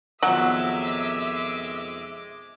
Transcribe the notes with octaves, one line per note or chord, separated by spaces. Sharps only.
F2 B2 D#3 F#3 G#3 E5 D6